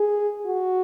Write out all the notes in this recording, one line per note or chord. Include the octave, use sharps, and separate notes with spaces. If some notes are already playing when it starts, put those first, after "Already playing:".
Already playing: G#4
F#4